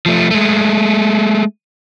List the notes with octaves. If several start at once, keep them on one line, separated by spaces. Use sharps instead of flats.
F3 A3
G#3 A3